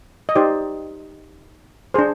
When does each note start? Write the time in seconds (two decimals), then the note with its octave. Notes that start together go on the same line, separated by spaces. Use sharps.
0.29 D#5
0.35 D#4 G4 C5 D5
1.94 D4 G#4 C5